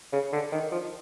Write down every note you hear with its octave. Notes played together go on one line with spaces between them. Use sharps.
C#3
D3
D#3
F3